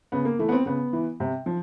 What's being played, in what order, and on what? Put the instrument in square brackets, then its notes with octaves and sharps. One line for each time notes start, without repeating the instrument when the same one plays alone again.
[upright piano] C#3 B3
A#3
E3 A3
B3
C4
C#3 B3
E3
C3
F3